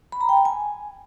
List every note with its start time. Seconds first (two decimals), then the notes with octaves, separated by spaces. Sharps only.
0.12 B5
0.21 A#5
0.29 G5
0.37 B5
0.45 G#5